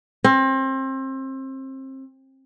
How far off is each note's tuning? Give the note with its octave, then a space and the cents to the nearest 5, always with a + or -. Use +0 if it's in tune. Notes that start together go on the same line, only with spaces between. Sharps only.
C4 +30